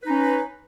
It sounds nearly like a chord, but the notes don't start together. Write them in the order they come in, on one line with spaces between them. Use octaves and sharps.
B4 D#4 C#4